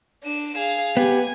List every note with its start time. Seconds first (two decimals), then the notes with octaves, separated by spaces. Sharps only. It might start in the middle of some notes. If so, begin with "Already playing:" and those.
0.24 D4 E7
0.57 G#4 F5
0.97 B3 G4 G#5